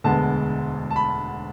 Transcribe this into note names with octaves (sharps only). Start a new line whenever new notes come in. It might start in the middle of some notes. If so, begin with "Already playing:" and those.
E1 D2 D3 G#3 B3 A5
A5
B5